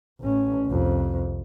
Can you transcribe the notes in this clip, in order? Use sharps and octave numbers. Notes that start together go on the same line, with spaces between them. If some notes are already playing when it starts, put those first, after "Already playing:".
A1 C#4
C2 F2